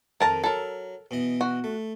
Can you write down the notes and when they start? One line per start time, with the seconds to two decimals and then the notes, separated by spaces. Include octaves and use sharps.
0.21 F2 D#3 A#4 A5 A#5
0.44 F#3 A4 A#4
1.11 B2 E3 D#5
1.41 F#4
1.64 A3